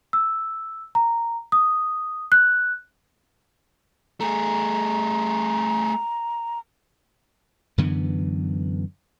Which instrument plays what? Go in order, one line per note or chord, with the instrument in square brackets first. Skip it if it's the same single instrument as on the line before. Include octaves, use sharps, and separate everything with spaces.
[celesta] E6
A#5
D#6
F#6
[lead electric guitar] A3 G#4 [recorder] A#5
[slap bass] F#2 D3 E3 B3